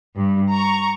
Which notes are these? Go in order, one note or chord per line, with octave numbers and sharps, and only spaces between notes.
G2
A#5 C#6